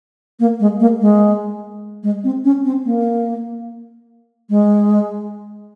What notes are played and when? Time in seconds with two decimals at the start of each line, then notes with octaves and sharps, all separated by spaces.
0.40 A#3
0.60 G#3
0.80 A#3
1.01 G#3
2.03 G#3
2.24 C4
2.44 C#4
2.65 C4
2.85 A#3
4.50 G#3